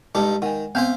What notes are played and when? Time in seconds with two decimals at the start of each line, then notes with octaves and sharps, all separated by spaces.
0.15 G2 G#3 D#4 A4
0.42 D#3 F#5 G#5
0.75 B3 C4 C5 E5 F5